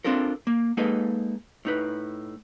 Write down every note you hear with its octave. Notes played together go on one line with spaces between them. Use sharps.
C4 D4 F4 A4 A#4
A#3
G#3 A#3 D#4 A4 B4 D#5
A2 D#4 B4